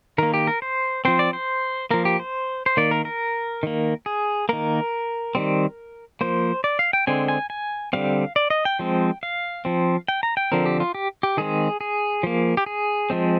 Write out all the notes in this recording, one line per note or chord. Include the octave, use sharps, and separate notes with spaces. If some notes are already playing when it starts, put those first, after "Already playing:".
D#3 A#3 A#4
G4
A#4
C5
F3 C4 C5
D5
C5
F3 A#3 A#4
G4
C5
C5
D#3 A#3 D5
A#4
A#4
D#3 A#3
G#4
D#3 A#3 A#4
D#3 G3 C4
F3 A#3 C5
D5
F5
G5
D3 G#3 C4 G#5
G#5
G#5
D3 G3 C4 F5
D5
D#5
G5
F3 G#3 C4
F5
F3 C4
G5
A#5
G5
D3 F3 C4 A#4
G4
F4
G4
G4
D#3 G#3 C4 G#4
G#4
F3 A#3
G4
G#4
F3 G#3 C4